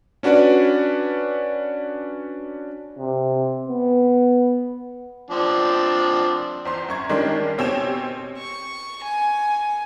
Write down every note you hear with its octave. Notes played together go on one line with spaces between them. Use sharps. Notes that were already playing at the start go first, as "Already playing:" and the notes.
C#4 D4 F#4 B4 D5
C3
B3
F3 C4 D4
E2 C5 C6
F#2 C#6 G#6
D#3 G3 G#3 C#4 D4
B2 C4 G4 C#5 G#5 E7
C#6
G#5